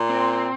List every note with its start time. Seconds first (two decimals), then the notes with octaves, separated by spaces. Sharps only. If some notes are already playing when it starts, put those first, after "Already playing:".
Already playing: A#2
0.09 C4